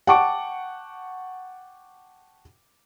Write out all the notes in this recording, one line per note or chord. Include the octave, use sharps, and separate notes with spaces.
F#5 G5 A5 C#6 D6 D7